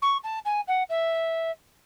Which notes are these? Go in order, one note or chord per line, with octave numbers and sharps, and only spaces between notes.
C#6
A5
G#5
F#5
E5